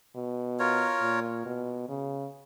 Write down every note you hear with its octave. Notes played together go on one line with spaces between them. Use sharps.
B2
F4 A#4 C#5
A#2
B2
C#3